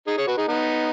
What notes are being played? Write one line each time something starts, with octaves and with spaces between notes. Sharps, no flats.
D#4 G#4
G#4 C#5
F#4 B4
D#4 G#4
B3 D#4